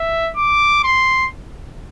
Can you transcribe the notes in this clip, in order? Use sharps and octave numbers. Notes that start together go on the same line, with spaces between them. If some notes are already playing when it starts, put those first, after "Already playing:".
Already playing: E5
D6
C6